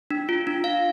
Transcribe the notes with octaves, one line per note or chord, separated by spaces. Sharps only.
D4
F4
D4
F5